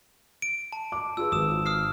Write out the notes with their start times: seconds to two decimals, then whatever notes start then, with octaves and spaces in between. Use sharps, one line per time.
0.42 D7
0.72 A5
0.92 D6
1.17 F4 G#4 B4 E6
1.32 G#1 D#6 E7
1.66 D#6 F6 C7